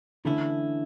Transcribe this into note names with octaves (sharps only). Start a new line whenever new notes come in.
D3 E3 A3 C#4 E4